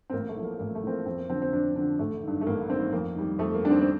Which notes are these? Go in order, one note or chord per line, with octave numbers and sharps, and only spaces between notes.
C4
A1 A#3
A3
A2 F3
A#3
A1 A#3
A3
A2 F3 C4
A#3
F2 C4
A#3
D3 F3 C4
C4
F2 D4
D3 F3 C4
A1 A3
G2 D#3
A3
A1 A#3
G2 D#3 C4
F2 A#3
D#3 G3
F2 A3
A#3
D#3 G3 D4
C4
C4